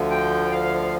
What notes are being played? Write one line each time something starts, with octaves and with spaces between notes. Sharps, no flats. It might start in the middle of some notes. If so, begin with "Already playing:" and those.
Already playing: D2 D3 F3
G5
F5